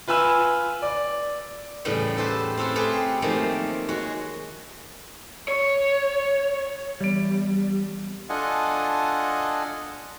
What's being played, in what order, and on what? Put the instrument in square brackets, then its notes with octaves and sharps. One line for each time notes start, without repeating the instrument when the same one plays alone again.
[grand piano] F4 B4 G#5 E6
D5
[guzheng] E2 A2 C#3 G3 B3
G4 A4 B4 C5 E5
C4 F4 A4 B4 C#5
A3 C4 G4 G#4 B4
D#3 F3 F#3 A3 A#3 C4
G#3 F#4 C#5
[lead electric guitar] C#5
[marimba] E3 B3 [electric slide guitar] G3
[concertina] D4 F4 A4 D#5 F#5 G#5